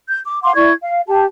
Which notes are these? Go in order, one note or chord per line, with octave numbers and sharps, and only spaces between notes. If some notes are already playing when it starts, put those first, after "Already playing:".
G6
D6
F5 F#5 C6 D6
E4 D5 C#6 G#6
F5
G4 A5